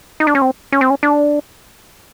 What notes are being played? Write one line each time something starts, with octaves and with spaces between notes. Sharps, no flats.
D#4
D4
C#4
C4
C#4
C4
C#4
D4